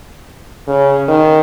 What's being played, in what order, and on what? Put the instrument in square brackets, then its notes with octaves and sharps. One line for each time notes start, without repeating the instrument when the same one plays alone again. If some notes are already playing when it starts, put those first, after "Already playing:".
[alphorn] C#3
D#3